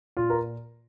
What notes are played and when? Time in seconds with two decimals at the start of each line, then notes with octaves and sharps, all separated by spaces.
0.17 A#2 F4
0.30 A#4